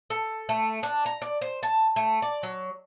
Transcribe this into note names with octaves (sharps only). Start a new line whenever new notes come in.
A4
A3
D4
A#5
D5
C5
A5
A3
D5
F#3